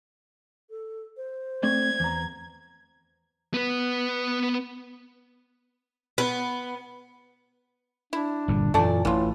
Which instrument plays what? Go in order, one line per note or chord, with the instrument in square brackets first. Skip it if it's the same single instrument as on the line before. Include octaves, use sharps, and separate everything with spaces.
[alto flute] A4
C5
[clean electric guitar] A3 C4 D5 [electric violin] G#6
[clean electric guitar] E2 A#5
[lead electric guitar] B3 B4
[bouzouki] B3
[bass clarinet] D4 [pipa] E4
[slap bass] G1 A#2 G3
[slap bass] F#2 E3 [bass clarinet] A#2 [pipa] A3 D4 D5
[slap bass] A1 [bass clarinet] A2 [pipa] E3 F4